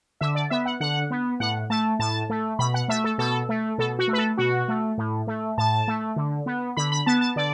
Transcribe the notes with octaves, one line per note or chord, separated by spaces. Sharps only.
D3 E5
D5
B3 E5
F#5
D3 F#5
B3
A2 F#5
A3 A5
A2 A5
A3
B2 B5
F#5
A3 E5
A4
B2 A4
A3
B2 A4
F#4
A3
B4
A4
B2 F#4
A3
A2
A3
A2 A5
A3
D3
B3
D3 B5
B5
B3 A5
A5
D3 D5